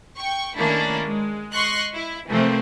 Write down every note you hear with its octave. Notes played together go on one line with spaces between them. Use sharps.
G5 C#6
D#3 A3 A#3 C#4 D4 E4
G#3
D#5 C6 C#6 F#6
E4
C3 E3 F3 A3 A#3 C4